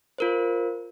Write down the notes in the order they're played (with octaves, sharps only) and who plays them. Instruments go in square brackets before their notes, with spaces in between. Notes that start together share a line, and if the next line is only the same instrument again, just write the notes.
[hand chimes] F4 A#4 C5